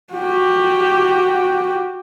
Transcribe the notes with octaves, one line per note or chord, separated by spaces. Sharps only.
F#4 G4